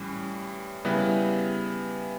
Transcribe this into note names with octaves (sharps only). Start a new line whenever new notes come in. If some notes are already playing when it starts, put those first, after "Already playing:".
Already playing: A2 E3 G3 C#4
C#3 G3 B3 E4 B4